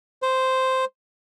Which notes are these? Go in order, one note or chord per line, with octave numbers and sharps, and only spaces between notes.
C5